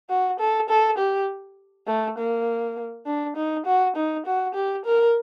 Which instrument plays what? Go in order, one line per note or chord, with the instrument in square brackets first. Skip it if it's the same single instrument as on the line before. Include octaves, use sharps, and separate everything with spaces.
[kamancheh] F#4
A4
A4
G4
A3
A#3
D4
D#4
F#4
D#4
F#4
G4
A#4